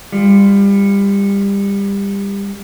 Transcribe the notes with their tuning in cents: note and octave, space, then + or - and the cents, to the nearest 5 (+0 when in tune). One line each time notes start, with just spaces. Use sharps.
G3 +25 F4 -5